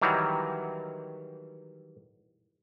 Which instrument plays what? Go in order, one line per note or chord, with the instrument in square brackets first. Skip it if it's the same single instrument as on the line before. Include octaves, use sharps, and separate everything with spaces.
[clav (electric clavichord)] D#3 E3 F#3 G3